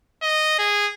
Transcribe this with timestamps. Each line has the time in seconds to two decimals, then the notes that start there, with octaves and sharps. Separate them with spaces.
0.23 D#5
0.59 G#4